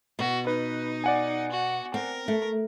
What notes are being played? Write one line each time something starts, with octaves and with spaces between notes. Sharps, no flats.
B2 F#4
D#4 B4
D5 F#5 G#5
F#4
C4 A#4
A3